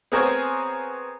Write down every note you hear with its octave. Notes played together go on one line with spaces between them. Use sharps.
B3 C4 G#4 A#4 C5 C#5